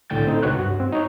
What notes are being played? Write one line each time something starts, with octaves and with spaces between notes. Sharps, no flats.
C2 A2 D3 G5 G6 A6
C4 D#4 A4
C#2 C3 F#4 B4 C#5 F#6
G2 F#4
C4
D#4 C#5